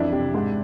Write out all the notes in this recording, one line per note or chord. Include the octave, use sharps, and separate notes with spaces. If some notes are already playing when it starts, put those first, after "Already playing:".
Already playing: F2 E3 D4 E4
C3
G#2